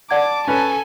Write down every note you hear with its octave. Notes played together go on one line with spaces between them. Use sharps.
D5 F#5 A5 D6 G#6
C#4 A4 B4 G#5